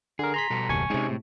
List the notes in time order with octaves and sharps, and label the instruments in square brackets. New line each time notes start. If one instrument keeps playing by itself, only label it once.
[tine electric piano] D3 A#4 [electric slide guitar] G#4
[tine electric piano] A#5 C6 B6
[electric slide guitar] B2 G3 A4
[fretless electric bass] F#1 D#2 [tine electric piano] G#5 C#6
[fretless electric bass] C3 G#3 [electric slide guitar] C4 C#4 D#4
[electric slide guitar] A2